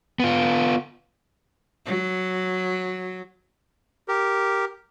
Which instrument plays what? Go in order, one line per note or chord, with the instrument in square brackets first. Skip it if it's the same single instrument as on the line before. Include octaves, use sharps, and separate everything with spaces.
[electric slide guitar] B3 F4
[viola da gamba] F#3
[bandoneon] G4 A#4